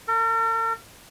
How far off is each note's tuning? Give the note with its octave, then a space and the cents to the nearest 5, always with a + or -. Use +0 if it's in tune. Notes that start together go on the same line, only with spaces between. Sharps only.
A#4 -45